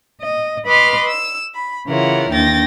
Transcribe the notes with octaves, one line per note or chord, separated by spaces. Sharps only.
D#5
B4 D#5 B5 C6 D6 F6
E6
B5
C#3 E3 F4 A#4 C#5 F#5
D#2 D4 G5 A6 A#6